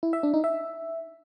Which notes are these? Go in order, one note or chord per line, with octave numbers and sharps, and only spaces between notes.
E4
E5
D4
D#4
E5